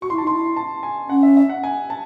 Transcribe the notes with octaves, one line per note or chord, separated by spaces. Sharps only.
F#4 C#6
E4 C6
A5
D#4 C6
E4
A5
G#5
C#4 F#5
E5
E5
F#5
G#5
A5